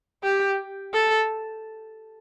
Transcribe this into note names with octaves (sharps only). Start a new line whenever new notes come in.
G4
A4